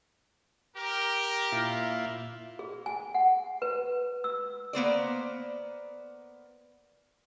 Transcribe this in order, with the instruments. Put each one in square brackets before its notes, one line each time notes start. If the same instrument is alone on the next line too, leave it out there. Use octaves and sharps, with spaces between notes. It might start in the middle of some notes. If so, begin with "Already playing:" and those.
[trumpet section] G4 A#4
[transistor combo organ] A#2 E4 F4
[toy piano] G#4
G#5
F#5
B4
E6
[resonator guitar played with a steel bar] A#3 B3 C5 D5